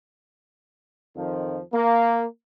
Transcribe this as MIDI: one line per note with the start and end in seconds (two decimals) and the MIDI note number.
1.15 1.60 41
1.15 1.60 51
1.15 1.60 53
1.73 2.22 58